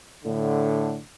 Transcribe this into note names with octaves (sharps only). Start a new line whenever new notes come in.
A2 D3